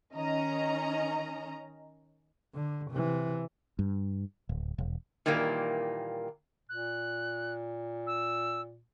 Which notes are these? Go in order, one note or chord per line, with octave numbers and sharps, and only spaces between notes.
D#3 C#4 D#5 A#5
D3
C3 E3
G2
D1
E1
A#2 D#3 E3 G3 A#3
A#2 F#6
E6